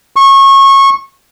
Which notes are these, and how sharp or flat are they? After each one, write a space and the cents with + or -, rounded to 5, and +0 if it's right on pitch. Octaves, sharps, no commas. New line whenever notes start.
C#6 -25